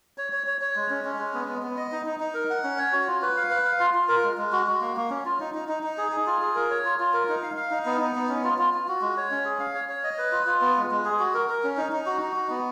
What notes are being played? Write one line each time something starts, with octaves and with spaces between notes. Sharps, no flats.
C#5
C#5
C#5
C#5
G#3
C#4
C#4
G#3
B3
B3
B3
D#5
D#4
D#4
D#4
A#4
F#5
C#4
C#5
F#4
F4
B4
F5
B4
F5
F4
F4
A#4
G#3
G#3
F#4
F#4
A#3
A#3
C#4
F4
D#4
D#4
D#4
D#4
G#4
G#4
F4
G#4
A#4
C#5
F4
F4
A#4
D#4
F5
F5
D#4
B3
D#4
B3
C#4
F4
F4
F4
F#4
G#3
C#5
C#4
G#4
F5
C#5
C#5
D#5
B4
F4
F4
B3
G#3
G#3
G#4
F#4
A#4
A#4
C#4
D#4
D#4
F#4
D#4
F#4
B3